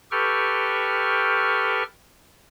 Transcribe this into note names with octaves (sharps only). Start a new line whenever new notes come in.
G4 A4 B4 G5 C#6 F6